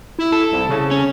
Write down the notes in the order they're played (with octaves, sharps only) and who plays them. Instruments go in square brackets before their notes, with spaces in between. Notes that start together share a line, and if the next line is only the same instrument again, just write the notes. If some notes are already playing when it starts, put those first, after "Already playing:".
[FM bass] E4
[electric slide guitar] A4
[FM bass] C2
C#3
[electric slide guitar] C#4